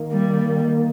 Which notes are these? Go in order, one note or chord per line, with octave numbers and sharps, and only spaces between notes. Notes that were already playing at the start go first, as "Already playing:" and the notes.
Already playing: D#3 A#3
G3